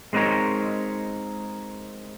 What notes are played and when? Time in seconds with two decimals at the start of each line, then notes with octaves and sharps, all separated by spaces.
0.13 G#3 C4 D4 D#4 A#4 C#5